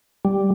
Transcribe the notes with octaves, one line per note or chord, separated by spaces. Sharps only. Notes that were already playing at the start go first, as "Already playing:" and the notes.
G3